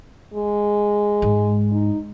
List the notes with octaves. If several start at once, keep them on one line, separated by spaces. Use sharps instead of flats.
G#3
G#2
D#4